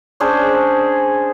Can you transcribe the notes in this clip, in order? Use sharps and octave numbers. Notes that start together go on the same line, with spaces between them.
C#4 D4 G#4 C5